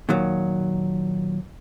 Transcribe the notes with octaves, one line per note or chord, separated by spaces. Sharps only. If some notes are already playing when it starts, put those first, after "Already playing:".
A#2 D#3 F#3